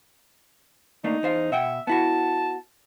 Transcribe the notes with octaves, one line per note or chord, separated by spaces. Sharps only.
A3 A#3 D4 D#4
E2 C5 F5
B2 E5 F#5 G5
B3 E4 F#4 A5